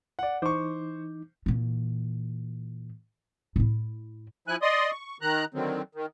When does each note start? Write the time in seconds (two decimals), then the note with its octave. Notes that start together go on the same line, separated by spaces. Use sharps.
0.19 D5 F#5
0.42 E3 D#4 C5 C#6 D6
1.46 A#2 E3
3.56 A2 E4
4.48 F3 E4 G#5 F#6
4.62 D5 D#5 C6 D#6
4.91 C#6
5.21 D#3 A#5 F#6
5.54 D3 D#3 F#3 C4
5.95 D#3